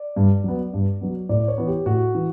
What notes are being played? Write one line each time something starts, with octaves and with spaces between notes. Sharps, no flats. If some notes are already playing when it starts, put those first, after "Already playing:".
Already playing: D5
G2
F#3 B3
G2
F#3 B3
A2 D5
C#5
E3 B3
G4
A2 F#4
E3